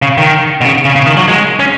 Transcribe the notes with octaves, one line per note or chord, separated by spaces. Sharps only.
C#3
D#3
B2
C#3
C#3
C#3
D#3
F#3
G#3
C#4